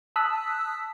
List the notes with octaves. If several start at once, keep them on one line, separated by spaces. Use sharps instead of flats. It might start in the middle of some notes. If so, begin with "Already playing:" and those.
A5 D#6 E6 F#6 B6